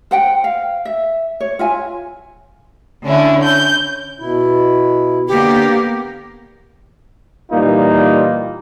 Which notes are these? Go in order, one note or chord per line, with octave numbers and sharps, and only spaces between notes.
C5 F#5 G5
F5
E5
C#5
F4 E5 G#5
D3 C#4 E4
C#4 G6
B2 E4
D3 A#3 B3 G4
A#2 E3 G3 A#3 D#4 F4